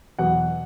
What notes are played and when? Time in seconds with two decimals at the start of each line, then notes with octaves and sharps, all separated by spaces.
0.19 E2 B2 F#3 F#5